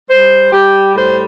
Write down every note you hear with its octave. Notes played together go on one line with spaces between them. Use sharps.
G3 C5
G3 G4
A2 C5